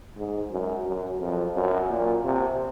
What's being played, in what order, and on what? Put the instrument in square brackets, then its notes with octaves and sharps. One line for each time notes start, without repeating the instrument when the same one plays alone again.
[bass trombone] G#2
F#2
F#2
F2
F#2
A#2
C3